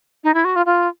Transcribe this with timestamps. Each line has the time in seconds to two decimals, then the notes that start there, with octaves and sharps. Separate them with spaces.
0.24 D#4
0.34 E4
0.45 F#4
0.56 F4
0.66 F4